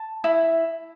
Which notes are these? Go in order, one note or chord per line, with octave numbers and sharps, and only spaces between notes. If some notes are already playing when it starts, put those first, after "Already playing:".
Already playing: A5
E4